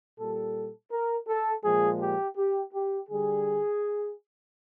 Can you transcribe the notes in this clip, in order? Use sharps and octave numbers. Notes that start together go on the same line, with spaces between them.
A#2 G3 A4
A#4
A4
A#2 F3 G#3 G#4
G4
G4
G4
D3 G3 G#4